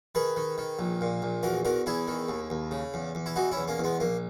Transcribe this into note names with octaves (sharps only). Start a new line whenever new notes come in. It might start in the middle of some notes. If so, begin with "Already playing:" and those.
D#3 G#4 B4
D#3
D#3
A#1
A#2
A#1
E2 F#4 A#4
E2 F#4 A#4
E2 E4 G#4
D#3
D#2
D#2
C#3
E2
E2
E4
E3 D#4 F#4
C#4 E4
E2
A#3 C#4
E2
G#3 B3
A#1 A#3